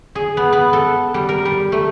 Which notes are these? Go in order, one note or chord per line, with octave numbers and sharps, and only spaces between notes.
G#4
B3
B3
A4
G3
A#4
G3
A3